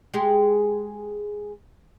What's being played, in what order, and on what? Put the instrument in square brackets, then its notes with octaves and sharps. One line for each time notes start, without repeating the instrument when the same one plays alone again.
[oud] G#3 G4 G#4